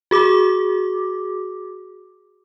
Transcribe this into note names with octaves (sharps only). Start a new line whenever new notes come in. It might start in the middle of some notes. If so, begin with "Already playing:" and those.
F#4 G#4 D6